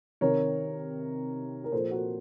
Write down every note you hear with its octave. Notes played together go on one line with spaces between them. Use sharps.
C3 D#3 A#4 C#5
A#4
A#2 F3 A4 C5
F#4 A#4